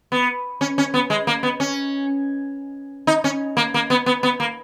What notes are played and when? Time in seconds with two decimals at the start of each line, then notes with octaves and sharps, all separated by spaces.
0.12 B3
0.61 C#4
0.78 C#4
0.94 B3
1.10 G#3
1.27 A#3
1.43 B3
1.60 C#4
3.07 D#4
3.24 C#4
3.57 A#3
3.74 A#3
3.90 B3
4.06 B3
4.23 B3
4.40 A#3